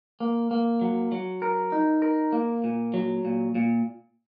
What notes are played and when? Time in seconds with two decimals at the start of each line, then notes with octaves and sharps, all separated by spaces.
0.20 A#3
0.51 A#3
0.81 F#3
1.12 F#3
1.42 A#4
1.72 D#4
2.02 A#4
2.32 A#3
2.64 A#2
2.94 F#3
3.25 A#2
3.55 A#2